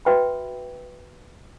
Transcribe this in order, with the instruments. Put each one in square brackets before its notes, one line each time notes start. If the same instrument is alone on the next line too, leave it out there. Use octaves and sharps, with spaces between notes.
[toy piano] F#4 B4 E5 G5 B5